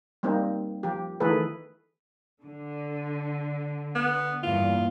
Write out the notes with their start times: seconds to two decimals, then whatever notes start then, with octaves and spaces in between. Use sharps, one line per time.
0.23 G3 A#3 C4 D#4
0.83 F3 G4
1.20 D#3 E3 A3 G#4 A4 B4
2.43 D3
3.95 B3
4.43 E2 G2 A#2 F4